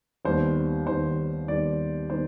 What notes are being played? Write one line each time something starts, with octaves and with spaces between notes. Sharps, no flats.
D#2 D#3 G3 B3 C5
D#2 D#3 G3 B3 C5
D#2 D#3 G3 B3 D5
D#3 G3 B3 C5